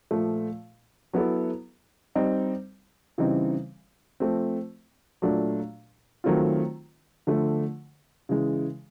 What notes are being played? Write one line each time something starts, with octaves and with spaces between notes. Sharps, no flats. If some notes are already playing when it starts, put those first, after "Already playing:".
A#2 F3 A3
F#3 B3 E4 A4
G3 C4 D#4
C#3 E3 G3 C4 D#4
F3 A3 C4
A#2 F#3 A3 D4
D#3 F#3 A3 C4 F4
D3 F3 A3
C#3 E3 G#3